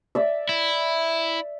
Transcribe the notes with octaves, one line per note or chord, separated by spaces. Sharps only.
D5 E5
E4